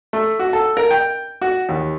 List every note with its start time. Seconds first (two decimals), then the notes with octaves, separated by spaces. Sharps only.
0.13 A3
0.39 F#4
0.53 A4
0.77 A#4
0.90 G5
1.41 F#4
1.69 D#2